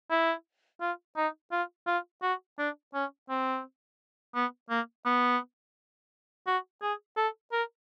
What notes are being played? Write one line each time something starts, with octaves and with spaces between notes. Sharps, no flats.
E4
F4
D#4
F4
F4
F#4
D4
C#4
C4
B3
A#3
B3
F#4
G#4
A4
A#4